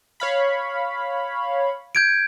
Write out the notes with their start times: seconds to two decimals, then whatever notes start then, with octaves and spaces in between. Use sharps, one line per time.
0.20 C#5 F5 B5
1.95 G6 G#6 D7